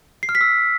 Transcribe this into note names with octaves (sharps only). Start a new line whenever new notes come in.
C7
F6
B6
E6